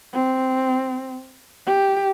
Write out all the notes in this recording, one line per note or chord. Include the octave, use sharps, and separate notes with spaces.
C4
G4